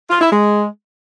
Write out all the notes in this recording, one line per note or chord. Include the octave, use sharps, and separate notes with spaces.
F4
E4
G#3